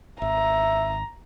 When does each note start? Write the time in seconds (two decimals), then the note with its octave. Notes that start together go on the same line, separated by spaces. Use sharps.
0.22 G#1 E5 A#5